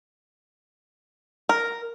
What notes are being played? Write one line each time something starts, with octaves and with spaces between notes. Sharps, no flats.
A#4